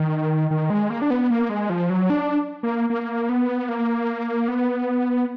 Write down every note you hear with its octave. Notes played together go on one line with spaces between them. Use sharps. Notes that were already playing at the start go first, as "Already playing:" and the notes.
Already playing: D#3
D#3
G#3
A#3
D4
B3
A#3
G#3
F3
F#3
D4
A#3
A#3
B3
A#3
B3